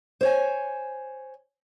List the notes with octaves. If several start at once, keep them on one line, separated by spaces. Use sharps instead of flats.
C5 C#5 G#5